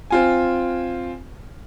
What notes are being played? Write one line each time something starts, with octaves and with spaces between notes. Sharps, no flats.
C4 F4 G#5